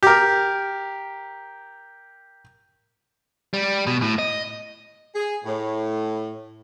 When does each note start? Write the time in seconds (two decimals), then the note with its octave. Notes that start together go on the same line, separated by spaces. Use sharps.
0.03 G4 A#4
3.54 G3
3.87 B2
4.02 A2
4.19 D#5
5.15 G#4
5.45 A2